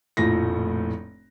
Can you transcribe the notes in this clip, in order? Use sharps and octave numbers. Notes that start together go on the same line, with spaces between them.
F1 A#1 A2 A#6